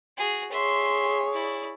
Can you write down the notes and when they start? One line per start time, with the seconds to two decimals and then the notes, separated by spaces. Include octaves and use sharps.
0.17 F#4 G#4
0.52 G#4 C#5 E5 C6
1.33 E4 D5